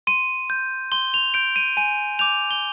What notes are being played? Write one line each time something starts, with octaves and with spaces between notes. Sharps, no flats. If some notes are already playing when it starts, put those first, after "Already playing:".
C6 D#7
G6
C6 G7
F7
G6 D7
D#7
G#5 D#7
D6 G6 F7
G7